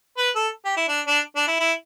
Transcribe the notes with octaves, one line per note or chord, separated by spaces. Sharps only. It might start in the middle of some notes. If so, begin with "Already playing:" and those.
B4
A4
G4
E4
D4
D4
D4
E4
E4